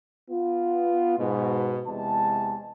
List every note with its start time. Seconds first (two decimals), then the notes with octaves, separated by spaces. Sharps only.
0.30 B3 F4
1.18 G#2 B2
1.87 E2 C3 G#3 A5